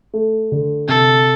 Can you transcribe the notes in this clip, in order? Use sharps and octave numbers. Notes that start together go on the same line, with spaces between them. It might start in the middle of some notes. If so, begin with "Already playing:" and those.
A3
D3
C3 A4